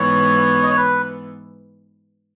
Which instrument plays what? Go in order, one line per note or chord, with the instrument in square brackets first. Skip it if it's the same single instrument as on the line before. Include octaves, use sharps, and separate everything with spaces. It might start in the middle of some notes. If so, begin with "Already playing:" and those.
Already playing: [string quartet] G#2 E3 B3 [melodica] C#5
[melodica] D#5
C#5
B4